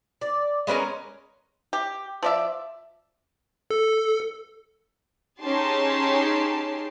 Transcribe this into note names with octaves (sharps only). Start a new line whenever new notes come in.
D5
G#3 B3 C#4 A#4
G4
F3 D5 E5
A4
C#4 D#4 G4 G#4 A5 C6